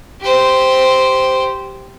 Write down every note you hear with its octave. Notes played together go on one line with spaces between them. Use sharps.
G4 C5